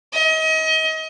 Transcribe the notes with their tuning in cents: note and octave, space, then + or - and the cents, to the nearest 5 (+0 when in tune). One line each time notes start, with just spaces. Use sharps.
D#5 +35